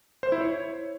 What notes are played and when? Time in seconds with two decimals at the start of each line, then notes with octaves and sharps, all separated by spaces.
0.23 C5
0.32 E4
0.41 C#5